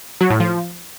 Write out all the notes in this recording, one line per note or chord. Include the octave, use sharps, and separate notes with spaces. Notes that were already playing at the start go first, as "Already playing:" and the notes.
F#3
A2
F3